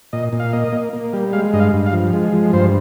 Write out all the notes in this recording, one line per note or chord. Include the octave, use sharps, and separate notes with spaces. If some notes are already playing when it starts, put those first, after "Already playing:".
A#2 D#5
A#2
F5
A#3 D#5
A#3
A#3
G3
G#3 F5
G2 D#5
F5
G2
F5
F3
G#3
F3
G2 C5